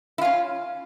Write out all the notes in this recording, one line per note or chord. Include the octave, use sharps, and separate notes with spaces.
C#4 E4 F4